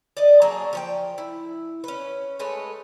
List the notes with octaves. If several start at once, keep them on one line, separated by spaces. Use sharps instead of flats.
D5 D#5
F#3 A#3 D4 G#4
F3 C#5 G5
E4
C#4 B4
G#3 A3 B4 C#5